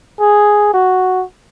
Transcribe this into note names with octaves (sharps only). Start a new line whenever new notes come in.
G#4
F#4